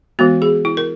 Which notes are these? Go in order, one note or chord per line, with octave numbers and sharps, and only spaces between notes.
E3 G#3 B3 F#4
G#4
E4
A#4